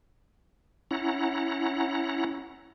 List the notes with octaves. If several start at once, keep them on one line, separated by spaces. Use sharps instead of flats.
C#4 E4 F#5 A#5